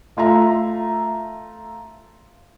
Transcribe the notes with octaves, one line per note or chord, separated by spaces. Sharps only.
A3 F4 E5 A#5